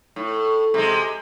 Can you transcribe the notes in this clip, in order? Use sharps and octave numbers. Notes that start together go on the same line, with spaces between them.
A2
C3 G#3